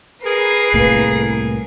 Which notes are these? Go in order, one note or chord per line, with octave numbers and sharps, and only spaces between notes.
G#4 A#4 B4 C7
C2 A2 A#3